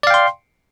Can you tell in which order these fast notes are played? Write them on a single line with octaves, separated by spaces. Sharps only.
D5 F5 G5 C6